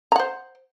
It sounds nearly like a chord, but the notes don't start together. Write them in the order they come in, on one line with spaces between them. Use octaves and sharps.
A#5 F#5 C5